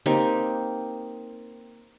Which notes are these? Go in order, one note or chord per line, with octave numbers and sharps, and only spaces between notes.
A#3 C4 D#4 G4